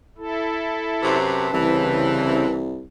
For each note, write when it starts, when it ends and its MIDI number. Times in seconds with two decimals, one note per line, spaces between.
0.18 1.17 64
0.18 1.17 69
1.02 1.50 42
1.02 1.50 48
1.02 2.53 71
1.02 2.53 81
1.53 2.83 36
1.53 2.46 49
1.53 2.60 52
1.53 2.46 60